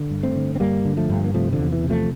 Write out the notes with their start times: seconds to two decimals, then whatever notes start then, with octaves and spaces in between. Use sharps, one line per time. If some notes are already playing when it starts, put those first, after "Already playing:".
Already playing: D3
0.11 G2
0.23 A3 C4
0.36 D3
0.55 C4
0.60 G2 G3 A#3
0.85 D3
0.97 F3 A3
1.10 G2
1.24 A#3
1.34 C3 F3 A3
1.53 D3 F3
1.59 E2
1.72 E3
1.84 C3
1.90 F3 A3